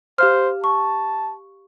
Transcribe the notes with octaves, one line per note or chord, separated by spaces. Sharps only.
G4 C5 F5 F6
A5 C#6